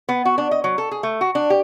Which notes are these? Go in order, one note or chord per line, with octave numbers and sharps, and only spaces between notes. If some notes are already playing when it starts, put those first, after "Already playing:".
B3
F#4
D4
D#5
F#3
A4
G#4
A3
F#4
D4
G4